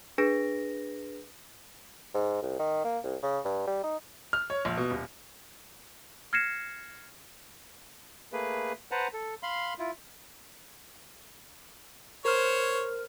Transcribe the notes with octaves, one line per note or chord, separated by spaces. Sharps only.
D4 G#4 B4 A#6 D7
G#2
C2
D#3
A#3
C2
C#3
G2
G3
D#4
F6
C#5
A#1
B2
D#1
F6 G#6 A#6 C7 C#7 E7
A3 A#3 G#4 B4
B4 C5 F#5 A5 A#5
A4
F5 B5 C6
E4 F4
A#4 C5 C#5 F6